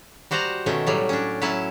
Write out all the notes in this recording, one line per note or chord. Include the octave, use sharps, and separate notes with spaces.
G3 F#4 C5 F#5 A5 A#5
B2 D#3 A3 C#4
A2 F#3 G3
C#4 D4
F#3 C#4 E4 A5